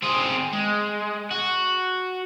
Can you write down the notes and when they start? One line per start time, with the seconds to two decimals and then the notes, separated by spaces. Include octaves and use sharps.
0.02 C4 G#4
0.53 G#3
1.31 F#4